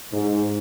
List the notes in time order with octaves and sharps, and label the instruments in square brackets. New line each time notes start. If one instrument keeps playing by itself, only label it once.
[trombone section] G#2